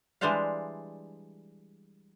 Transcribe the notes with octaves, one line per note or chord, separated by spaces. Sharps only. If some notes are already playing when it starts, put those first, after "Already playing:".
E3 G3 G#3 D4 C5 F5